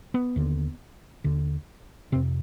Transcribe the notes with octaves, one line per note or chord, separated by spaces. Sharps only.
B3
D#2 D3
D#2 D3
F2 C3 C4